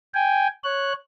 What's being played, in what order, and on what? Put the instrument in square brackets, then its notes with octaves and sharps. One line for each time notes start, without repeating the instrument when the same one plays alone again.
[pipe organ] G5 G#5
C#5 F#6